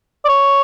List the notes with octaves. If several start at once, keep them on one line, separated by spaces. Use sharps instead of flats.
D5
C#5